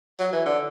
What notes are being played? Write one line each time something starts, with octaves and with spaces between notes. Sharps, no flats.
F#3
E3
D3